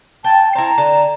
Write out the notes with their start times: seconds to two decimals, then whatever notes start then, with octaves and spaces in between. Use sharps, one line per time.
0.24 G5 A5
0.55 C4 E4 A#5
0.78 D3 A5